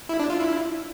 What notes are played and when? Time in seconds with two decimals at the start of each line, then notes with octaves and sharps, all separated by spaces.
0.09 E4
0.20 D4
0.30 F4
0.40 E4